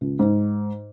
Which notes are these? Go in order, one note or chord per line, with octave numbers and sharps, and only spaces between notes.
C#2
G#2